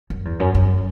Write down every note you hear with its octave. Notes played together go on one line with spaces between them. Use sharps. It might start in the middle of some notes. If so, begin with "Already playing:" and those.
F#2
E2
F#2
F#2